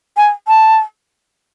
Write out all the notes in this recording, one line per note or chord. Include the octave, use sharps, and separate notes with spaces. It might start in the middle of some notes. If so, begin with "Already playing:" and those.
G#5
A5